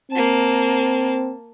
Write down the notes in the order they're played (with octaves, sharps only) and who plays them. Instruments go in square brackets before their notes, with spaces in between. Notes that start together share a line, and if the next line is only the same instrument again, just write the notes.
[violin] A#3 A5 [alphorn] C4